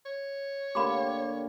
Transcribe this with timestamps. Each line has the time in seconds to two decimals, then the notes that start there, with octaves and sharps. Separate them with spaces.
0.06 C#5
0.75 D3 A#3 G4 B5 C6 D6